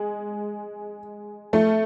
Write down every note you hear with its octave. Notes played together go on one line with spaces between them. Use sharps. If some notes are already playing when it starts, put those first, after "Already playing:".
Already playing: G#3
A3